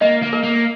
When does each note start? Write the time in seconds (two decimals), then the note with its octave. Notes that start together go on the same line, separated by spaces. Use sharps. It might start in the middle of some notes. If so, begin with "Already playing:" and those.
0.01 A#3 D#5
0.22 A#3
0.33 A#4
0.43 A#3